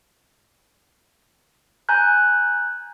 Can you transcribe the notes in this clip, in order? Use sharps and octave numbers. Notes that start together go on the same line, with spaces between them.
G#5 A#5 F#6 G6